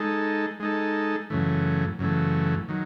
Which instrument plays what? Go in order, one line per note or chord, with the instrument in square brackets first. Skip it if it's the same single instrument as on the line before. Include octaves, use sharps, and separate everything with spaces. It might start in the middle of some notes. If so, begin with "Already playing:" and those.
Already playing: [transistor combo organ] G#3 D#4 A4
G#3 D#4 A4
F#2 C#3 E3 A3
F#2 C#3 E3 A3
D#3 F#3